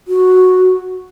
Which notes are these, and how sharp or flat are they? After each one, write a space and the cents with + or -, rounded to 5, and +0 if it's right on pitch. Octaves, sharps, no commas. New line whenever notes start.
F#4 -5